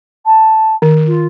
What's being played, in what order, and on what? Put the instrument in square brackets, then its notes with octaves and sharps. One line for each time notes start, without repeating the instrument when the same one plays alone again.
[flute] A5
[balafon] D#3
[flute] F4